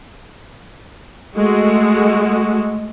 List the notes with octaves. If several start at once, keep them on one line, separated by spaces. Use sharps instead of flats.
G#3 A3 F#4